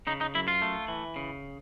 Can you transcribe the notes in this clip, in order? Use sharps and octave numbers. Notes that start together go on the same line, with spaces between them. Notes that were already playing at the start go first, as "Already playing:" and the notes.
C#3 D#4
D#4
F#2 E4
F4
A3
E3
C#3